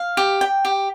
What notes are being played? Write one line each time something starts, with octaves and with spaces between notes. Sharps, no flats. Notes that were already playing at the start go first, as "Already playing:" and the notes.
Already playing: F5
G4
G5
G4